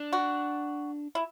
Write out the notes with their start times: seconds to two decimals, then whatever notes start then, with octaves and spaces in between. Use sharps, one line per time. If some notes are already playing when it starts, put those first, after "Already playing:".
Already playing: D4
0.13 F#4
1.15 E4